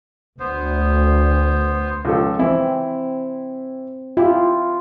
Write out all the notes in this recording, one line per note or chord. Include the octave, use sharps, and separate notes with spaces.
D2 B3 C5
C#2 F3 A4
E3 C4 E4
E4 F4 G4